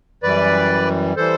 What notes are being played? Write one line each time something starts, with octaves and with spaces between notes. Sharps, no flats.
F#2 E3 G3 B4 D5
E3 G3 A4 C5